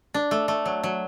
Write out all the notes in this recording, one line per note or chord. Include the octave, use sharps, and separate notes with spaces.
D4
A3
A3
F#3
F#3